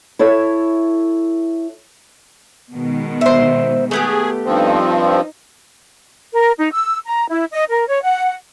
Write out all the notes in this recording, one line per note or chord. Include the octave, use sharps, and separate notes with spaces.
E4 A4 C#5 E5
B2 D#3 G#3
C5 E5
A3 B3 G4 G#4
G2 F3 C4 D#4
A#4
D#4
E6
A#5
E4
D#5
A#4
C#5
F#5